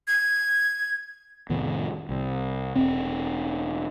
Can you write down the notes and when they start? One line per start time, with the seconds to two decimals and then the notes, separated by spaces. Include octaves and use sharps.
0.07 G#6
1.49 F1 A2 D#3 B3
2.09 C2
2.76 E1 C4